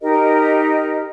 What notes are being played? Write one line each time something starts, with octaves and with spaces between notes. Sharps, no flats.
D#4 G4 A#4 D#5